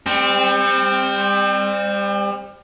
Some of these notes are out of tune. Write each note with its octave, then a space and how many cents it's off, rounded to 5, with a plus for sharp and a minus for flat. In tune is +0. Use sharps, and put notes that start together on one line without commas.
G3 +35 C4 +0